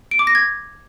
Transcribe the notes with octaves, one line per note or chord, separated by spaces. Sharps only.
D7
D6
A#6
G#6